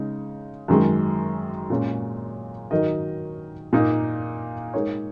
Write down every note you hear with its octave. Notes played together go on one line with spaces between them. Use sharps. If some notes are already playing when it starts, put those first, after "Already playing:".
Already playing: C#3 G#3 D#4
F#2 D#3 G#3
A#2 G#3 C#4
D#3 F#3 D#4 A#4 D#5
A#2 A#3 D#4
G#3 D#4 A#4 C#5